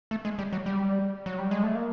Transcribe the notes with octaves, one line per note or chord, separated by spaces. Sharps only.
A3
G#3
G3
F#3
G3
F#3
G3
G#3
A3
A#3